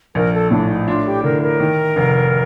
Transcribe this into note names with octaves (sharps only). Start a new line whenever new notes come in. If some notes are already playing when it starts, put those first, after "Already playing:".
A#1 A#4
A4
A2 D4
D#4
D4 F4
G4
D3 A#4
A#4
D#3
F1